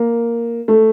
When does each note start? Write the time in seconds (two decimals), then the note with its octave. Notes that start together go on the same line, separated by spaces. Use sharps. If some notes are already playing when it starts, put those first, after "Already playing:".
Already playing: A#3
0.68 A3